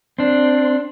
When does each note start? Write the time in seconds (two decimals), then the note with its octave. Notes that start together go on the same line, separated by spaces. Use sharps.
0.19 C4 D4